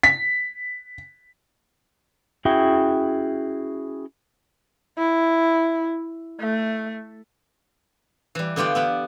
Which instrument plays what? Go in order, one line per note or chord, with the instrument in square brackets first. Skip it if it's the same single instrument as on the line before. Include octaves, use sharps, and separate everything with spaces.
[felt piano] B6
[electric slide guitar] C#4 E4 F#4 G#4 E5 G5
[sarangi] E4
A3
[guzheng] E3 G3
D3 B3 F4 G4 D5
B3 E4 B5